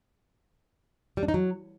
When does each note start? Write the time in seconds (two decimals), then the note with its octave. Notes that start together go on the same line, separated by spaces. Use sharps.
1.17 G3
1.23 D4
1.28 D#4
1.34 F#3